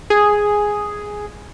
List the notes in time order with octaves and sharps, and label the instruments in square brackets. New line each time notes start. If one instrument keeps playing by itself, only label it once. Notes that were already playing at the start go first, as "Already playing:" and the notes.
[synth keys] G#4